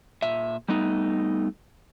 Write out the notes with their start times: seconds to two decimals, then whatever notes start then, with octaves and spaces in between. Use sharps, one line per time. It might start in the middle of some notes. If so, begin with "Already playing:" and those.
0.22 A#2 E5
0.69 G3 A3 B3 D#4